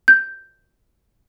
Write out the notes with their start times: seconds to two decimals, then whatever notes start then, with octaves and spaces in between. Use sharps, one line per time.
0.08 G6